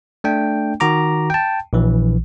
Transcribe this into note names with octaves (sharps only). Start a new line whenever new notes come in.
A3 D4 G5
D#3 F#4 A#5 D6
G5 A5
A#1 E3